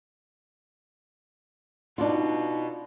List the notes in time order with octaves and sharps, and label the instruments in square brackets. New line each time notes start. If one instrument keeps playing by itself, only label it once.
[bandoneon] B2 [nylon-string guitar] D4 F4 [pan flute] D#4